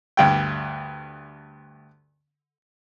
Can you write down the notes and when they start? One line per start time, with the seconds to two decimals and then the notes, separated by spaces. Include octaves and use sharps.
0.17 D2 G2 G5